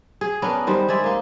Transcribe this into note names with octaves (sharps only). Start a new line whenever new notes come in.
G#4
B3 C#4 D4 A#4
D#3 G3 C5
G#3 G#4 D5 E5
A#3 D#4